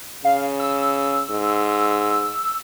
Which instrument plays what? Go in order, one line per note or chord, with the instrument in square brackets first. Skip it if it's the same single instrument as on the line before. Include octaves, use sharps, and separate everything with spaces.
[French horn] C#3 [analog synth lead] F5
[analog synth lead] E6
[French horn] G#2